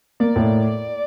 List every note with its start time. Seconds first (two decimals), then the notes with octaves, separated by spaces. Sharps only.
0.20 A#3 D5
0.36 A2